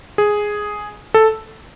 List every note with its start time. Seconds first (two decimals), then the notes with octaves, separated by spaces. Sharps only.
0.18 G#4
1.14 A4